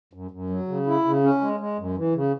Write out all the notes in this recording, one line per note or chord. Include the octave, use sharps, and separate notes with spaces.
F#2
F#2
F#3
C#3
E4
C#3
C#4
G#3
G#3
F#2
E3
C#3